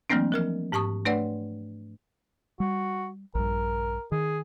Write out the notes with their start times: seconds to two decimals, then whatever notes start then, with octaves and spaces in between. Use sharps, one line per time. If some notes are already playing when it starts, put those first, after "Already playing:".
0.10 E3 F#3 A3 A#3 C4 D4
0.32 F3 A#4 F6
0.72 G#2 G4 A5 C#6 D#6
1.06 A3 D4 B4 C#5 D5 F#5
2.60 G3 F#4
3.35 A#1 G2 A#4
4.12 D#3 G#4